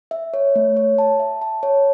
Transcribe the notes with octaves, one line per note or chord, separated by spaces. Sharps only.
E5
C#5
A3
C#5
A5
E5
A5
C#5